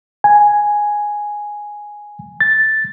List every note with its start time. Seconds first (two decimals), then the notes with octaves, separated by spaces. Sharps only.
0.24 G#5
2.41 A6